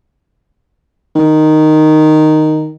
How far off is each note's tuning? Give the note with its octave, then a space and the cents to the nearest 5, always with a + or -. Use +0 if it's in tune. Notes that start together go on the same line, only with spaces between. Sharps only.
D#3 -5